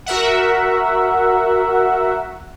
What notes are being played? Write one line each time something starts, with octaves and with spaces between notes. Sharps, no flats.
F#4 A#4 E5 F#5